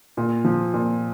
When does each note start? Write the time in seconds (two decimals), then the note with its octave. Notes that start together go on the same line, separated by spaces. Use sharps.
0.17 A#2
0.45 F3
0.74 A#2